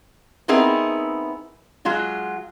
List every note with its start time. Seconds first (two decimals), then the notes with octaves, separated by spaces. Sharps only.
0.48 B3 C4 D#4 E4 G#4 A#4
1.85 F#3 G#3 F4 F#4